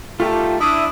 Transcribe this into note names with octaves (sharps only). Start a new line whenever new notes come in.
D#3 G3 A3 F4 G4 A5
D4 E4 E5 D#6